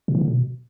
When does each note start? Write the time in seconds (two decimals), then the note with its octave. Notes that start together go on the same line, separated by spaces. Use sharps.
0.08 C3
0.15 E3
0.21 D3
0.28 B2